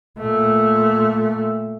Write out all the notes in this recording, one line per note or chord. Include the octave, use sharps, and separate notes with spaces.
A#2 A3